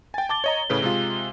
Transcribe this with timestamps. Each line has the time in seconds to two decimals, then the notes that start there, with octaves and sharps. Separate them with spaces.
0.14 G5 G#5 A6
0.29 A5 D6 A6 G7
0.44 C#5 D#5 A#5
0.70 A2 C#3 B4
0.82 C3 G#3 F4